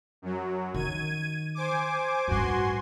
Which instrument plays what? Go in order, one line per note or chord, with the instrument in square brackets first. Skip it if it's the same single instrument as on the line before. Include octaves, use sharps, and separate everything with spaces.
[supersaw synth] F#2 F#3
[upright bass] D#3 [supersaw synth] G#6 D#7
[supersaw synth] C5 G#5 D6
[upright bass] A1 G2 [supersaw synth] F#4 G#5 C6